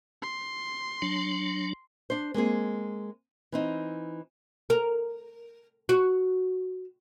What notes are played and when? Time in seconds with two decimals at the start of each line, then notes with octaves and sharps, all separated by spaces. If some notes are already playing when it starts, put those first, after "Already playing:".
0.22 C6
1.02 F#3 D4
2.10 D4 C5
2.34 G#3 A#3 C4 G#4
3.52 E3 C4 D#4
4.70 A#4
5.89 F#4